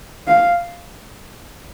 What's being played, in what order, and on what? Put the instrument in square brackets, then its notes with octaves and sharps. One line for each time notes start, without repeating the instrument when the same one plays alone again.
[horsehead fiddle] F5